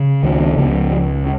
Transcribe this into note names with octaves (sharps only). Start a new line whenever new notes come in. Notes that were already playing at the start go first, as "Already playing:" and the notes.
Already playing: C#3
C#2 D#3
C#2 F3
C#3